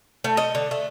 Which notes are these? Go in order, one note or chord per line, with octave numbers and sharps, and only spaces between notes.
A3
D#5
D3
A3